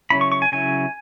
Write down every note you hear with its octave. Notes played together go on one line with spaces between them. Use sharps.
C#3 F#3 C#4 E4 B5
C#6
C#6
G#5
C#3 F#3 C#4 E4 G#5